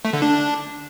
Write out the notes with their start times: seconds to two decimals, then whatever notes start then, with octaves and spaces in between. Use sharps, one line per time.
0.05 A3
0.13 D3
0.22 D4